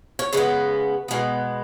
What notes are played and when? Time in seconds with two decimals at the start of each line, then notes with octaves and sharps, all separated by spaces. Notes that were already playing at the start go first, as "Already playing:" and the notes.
0.19 C#5
0.33 C#3 G#3 B3 B4
1.08 B2 G#3 B3